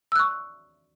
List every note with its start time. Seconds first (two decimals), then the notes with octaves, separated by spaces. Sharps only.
0.12 E6
0.16 F#6
0.19 C#6